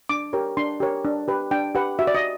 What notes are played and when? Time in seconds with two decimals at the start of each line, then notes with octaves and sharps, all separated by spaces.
0.09 D4 D6
0.33 G4 A#4 C#5
0.57 D4 C6
0.80 G4 A#4 C#5
1.05 D4
1.28 G4 B4
1.51 D4 G5
1.75 G4 B4 F#5
1.99 F#4 E5
2.07 D5
2.15 D#5